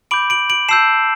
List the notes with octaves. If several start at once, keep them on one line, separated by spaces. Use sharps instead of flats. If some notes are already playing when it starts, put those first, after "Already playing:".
B5 D6 G6 D7 F#7
D7 F#7
D7 F#7
A5 E6 G6 C7 E7